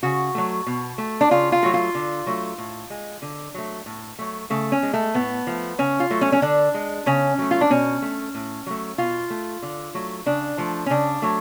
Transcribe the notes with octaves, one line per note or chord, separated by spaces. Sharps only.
C#3 F#4
F#3 A3
B2
A3
D4
C#3 F4
F4
F#3 A3 F#4
F4
D3
F#3 A3
A2
G#3
D3
F#3 A3
A2
F#3 A3
C#3 A3
C#4
G#3
A3
A2 B3
F3 A3
C#3 C#4
F4
F#3 A3
C#4
C#4
D3 D4
G#3
C#3 C#4
F#3 A3
F4
D4
B2 C#4
A3
A2
F#3 A3
B2 F4
A3
D3
F#3 A3
C#3 D4
F3 A3
C#4
C#3 D4
F#3 A3